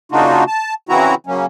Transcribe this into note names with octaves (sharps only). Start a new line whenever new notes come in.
C#3 A#3 D4 D#4 F4 F#4
A5
C#3 E3 C4 E4 F#4 A#5
C#3 F#3 A#3 C#4